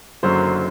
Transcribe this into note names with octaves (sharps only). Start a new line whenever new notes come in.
F#1 F#2 D3 F#3 C5